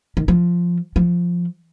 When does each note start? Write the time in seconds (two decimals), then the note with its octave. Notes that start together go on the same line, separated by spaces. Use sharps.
0.17 D#3
0.28 F3
0.96 F3